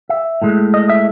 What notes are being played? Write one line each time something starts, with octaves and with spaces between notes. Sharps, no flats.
E5
A2 G#3
D#5
E5